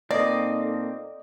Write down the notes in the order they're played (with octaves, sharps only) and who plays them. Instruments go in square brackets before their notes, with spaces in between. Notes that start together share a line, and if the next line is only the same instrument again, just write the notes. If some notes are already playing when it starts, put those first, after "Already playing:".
[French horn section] A#2 D#4 A4 [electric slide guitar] A#3 C4 [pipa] D5 [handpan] D#5